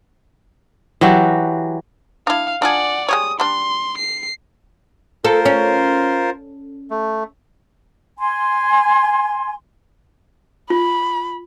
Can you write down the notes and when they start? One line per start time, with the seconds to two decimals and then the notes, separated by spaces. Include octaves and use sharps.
1.01 E3 F#3 F#4 G4
2.27 D4 E4 F5
2.62 D4 F4 G#4 D5 F#5
3.09 G#3 G4 C#5 D#6
3.40 G3 D4 C6
3.98 C7
5.24 F4 A4 A#4 C5
5.45 C#4
6.90 A3
8.19 G#5 C6
10.70 F4 B5